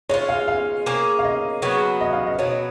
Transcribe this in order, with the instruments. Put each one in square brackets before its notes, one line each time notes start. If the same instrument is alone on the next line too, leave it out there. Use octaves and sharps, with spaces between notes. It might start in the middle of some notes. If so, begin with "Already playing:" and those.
[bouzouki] G#3 C#4 F4 [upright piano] C#5
[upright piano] F5
F5
[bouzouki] A#3 C#4 G#4 C#5
[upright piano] F5
D#5
[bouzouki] C#3 F#3 B3 F#4
[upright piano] D#5
F5
D#5
[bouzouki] B2 F#3 B3 [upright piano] C#5